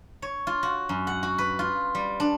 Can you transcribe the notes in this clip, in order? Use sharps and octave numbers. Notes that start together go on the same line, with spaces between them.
C#5
F4
F#4
F#2
F#5
F#4
B4
F4
G3
D4